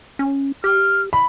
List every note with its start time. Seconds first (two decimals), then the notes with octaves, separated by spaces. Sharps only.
0.19 C#4
0.64 G4 F6
1.13 B5